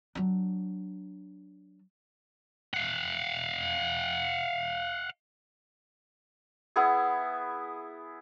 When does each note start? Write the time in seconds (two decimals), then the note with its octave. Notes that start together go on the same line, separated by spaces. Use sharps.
0.15 F#3 D4
2.74 F5 F#5
6.76 B3 E4 G#4